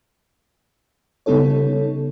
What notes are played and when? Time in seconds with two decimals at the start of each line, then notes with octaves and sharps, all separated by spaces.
1.26 C#3 G3 B3 D#4 A4 C#5